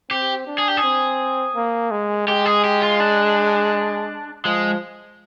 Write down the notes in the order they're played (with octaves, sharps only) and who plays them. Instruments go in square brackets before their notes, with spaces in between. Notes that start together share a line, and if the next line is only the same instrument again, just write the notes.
[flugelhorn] C4 [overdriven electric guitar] G4
[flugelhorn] D4
[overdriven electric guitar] G#4
G4
G#4
[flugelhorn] C4
A#3
G#3
[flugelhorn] G#3 [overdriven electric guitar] G4
[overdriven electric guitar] G#4
G4
F4
D4
[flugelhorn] F3 [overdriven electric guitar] G#3